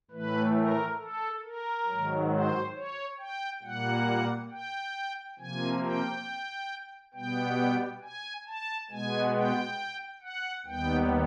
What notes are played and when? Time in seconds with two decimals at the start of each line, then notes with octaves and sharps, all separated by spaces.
0.11 A2 E3 A3 B4
0.54 A#4
0.98 A4
1.43 A#4
1.86 G#2 D#3 F#3
2.30 C5
2.74 C#5
3.19 G5
3.62 A#2 G3 A#3 F#5
4.51 G5
5.38 C3 F3 A#3 G#5
5.82 G5
7.14 B2 G3 B3 G5
8.02 G#5
8.47 A5
8.90 B2 G#3 B3 G#5
9.34 G5
10.22 F#5
10.65 D#2 D#3 G3 B3 G5